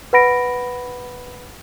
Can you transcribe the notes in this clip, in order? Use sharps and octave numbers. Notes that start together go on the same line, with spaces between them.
B4 F#5 B5 A#6 D7